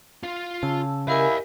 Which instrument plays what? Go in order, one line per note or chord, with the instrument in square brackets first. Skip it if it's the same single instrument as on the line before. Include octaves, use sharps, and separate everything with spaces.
[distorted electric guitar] F4 F5
[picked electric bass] C#3 [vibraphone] A5 E6
[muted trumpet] E4 [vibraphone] G4 A#4 G#5 [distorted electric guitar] D#5 F5